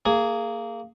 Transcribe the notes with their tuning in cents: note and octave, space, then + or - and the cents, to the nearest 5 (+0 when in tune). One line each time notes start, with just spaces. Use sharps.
A#3 -15 G#4 +0